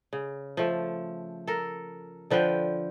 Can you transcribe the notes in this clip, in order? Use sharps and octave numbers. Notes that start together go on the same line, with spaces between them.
C#3
F3 A3
A4 A#4
D3 F3 B4 G5